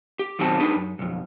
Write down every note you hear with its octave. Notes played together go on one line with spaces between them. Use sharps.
G4
B1 D#3 F#3 C4 G5 A5
D4 D#4 G4 B4
F#2
B1 F2